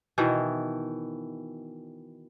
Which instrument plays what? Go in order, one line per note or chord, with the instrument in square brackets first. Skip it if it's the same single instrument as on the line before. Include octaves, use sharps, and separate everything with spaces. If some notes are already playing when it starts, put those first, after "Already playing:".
[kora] B2 D#3 E3